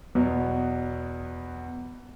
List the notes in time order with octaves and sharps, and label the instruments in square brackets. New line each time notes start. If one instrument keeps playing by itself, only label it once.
[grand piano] E2 B2 F#3 B3